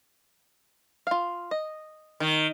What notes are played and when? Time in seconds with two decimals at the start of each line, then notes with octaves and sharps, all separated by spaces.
1.07 F4 F5
1.51 D#5
2.20 D#3